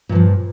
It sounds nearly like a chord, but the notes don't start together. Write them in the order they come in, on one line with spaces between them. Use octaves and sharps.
A#2 G2 F3